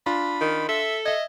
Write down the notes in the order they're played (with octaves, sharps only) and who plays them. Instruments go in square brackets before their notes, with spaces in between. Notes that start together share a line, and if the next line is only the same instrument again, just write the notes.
[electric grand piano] D4 F4 [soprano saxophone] B5
[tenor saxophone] D#3
[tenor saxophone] A4 [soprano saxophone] E5
[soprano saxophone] D#5 [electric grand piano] E5 G#6